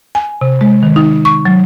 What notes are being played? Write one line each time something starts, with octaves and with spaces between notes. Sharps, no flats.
G#5
C3
G#3
D#3
D#4
C#6
F#3